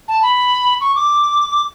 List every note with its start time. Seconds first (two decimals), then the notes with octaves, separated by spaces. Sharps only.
0.08 A5
0.22 B5
0.81 C#6
0.95 D6